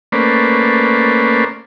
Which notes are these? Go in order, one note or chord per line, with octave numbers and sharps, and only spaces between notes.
A3 A#3 C#4 B4 C5 D5